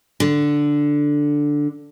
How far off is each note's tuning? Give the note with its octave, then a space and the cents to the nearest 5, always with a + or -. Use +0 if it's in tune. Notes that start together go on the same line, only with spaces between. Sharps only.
D3 +0